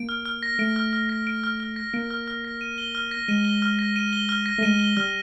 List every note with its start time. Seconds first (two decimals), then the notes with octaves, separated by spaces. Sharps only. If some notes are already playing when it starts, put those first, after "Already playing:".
Already playing: A#3 D7
0.09 F6
0.26 F6
0.43 A#6
0.59 A3 D7
0.76 F6
0.93 F6
1.09 A#6
1.27 D7
1.44 F6
1.60 F6
1.76 A#6
1.94 A#3 D7
2.11 F6
2.28 F6
2.45 A#6
2.61 D#7
2.78 G7
2.95 F6
3.11 A#6
3.28 G#3 D#7
3.45 G7
3.62 F6
3.79 A#6
3.96 D#7
4.13 G7
4.29 F6
4.46 A#6
4.58 A3
4.63 G#3 D#7
4.80 G7
4.97 G3 F6